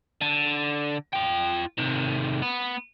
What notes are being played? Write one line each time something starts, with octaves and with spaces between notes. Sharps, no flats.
D3
F4 G5
C3 D#3
B3